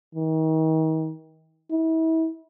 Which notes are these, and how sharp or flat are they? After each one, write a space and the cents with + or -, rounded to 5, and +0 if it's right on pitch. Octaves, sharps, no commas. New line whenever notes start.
D#3 +35
E4 -35